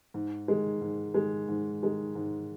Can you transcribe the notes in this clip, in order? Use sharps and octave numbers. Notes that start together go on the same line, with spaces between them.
G#2
D#3 G#3
G#2
D#3 G#3
G#2
D#3 G#3
G#2